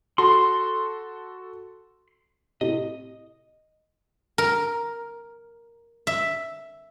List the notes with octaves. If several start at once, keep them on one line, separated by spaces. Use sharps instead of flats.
F#4 A4 C6
A2 C3 D#5
A#4
E5